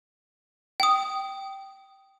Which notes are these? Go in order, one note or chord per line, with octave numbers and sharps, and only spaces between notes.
G5 D#6